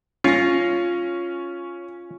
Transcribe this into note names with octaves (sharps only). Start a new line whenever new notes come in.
C#4 F4 A#6